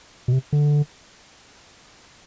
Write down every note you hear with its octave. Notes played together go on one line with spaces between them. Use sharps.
B2
C3
D3